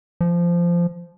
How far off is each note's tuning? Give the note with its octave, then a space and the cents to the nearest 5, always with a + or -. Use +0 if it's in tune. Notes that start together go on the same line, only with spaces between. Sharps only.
F3 -15